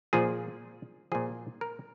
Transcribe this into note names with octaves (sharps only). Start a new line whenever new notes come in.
A#2 F3 G#4
A#2 F3 G#4
A#4